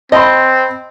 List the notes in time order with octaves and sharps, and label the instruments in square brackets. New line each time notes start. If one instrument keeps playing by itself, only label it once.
[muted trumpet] C4 [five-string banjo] D#5 [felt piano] A5 B5 C6